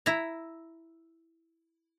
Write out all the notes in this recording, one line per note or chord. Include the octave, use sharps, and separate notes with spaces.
E4 A#5